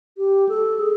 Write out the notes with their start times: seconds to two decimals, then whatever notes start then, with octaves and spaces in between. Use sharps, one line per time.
0.17 G4
0.49 A4
0.79 G#4